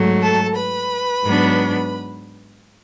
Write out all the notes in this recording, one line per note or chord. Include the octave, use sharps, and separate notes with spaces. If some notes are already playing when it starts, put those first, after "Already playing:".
Already playing: G#2 F#3 A3
A4 A5
B4 B5
G#2 F#3 B3 D4